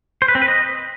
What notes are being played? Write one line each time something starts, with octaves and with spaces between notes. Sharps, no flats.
C5
B4
C4
B4
D#5